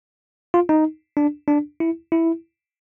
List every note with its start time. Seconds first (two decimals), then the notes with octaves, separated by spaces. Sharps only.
0.54 F4
0.69 D#4
1.17 D4
1.48 D4
1.80 E4
2.12 E4